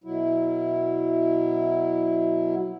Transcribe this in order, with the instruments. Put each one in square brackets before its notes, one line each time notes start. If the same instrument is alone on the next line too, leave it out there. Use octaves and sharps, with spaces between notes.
[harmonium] B2 F#3 E4